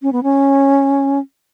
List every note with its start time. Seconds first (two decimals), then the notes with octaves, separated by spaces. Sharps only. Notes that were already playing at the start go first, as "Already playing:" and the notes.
0.02 C#4
0.13 B3
0.23 C#4